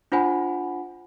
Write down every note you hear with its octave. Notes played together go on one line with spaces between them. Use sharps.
D4 F4 C5 F#5 G#5 B5